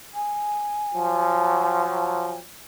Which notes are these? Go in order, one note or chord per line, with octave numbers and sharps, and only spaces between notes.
G#5
F3 F#3